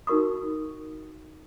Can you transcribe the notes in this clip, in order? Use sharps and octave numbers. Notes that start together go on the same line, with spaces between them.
D#4 F#4 A#4 C#6 D#6